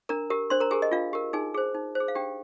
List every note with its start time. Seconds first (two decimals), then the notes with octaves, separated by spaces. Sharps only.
0.09 D4 A#4 A#5
0.30 G4 A#4
0.50 D4 C5 C6
0.60 A#4 A#5
0.71 G4 G#4 A#4 G#5
0.82 D#5
0.91 D4 F4 F5
1.13 G4 A#4
1.33 D#4 G#4 G#5
1.54 G#4 C5
1.75 D#4
1.95 C5
2.00 G#4
2.08 F5
2.15 D4 G4 G5